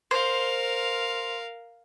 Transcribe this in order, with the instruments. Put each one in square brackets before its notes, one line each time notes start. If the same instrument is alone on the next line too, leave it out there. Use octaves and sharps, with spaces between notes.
[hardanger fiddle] A#4 F5 [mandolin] C5